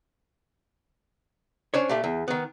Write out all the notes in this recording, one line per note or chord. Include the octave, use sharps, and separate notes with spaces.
C#4 D4 C5 C#5
A#2 A3 G4
E2
D#3 B3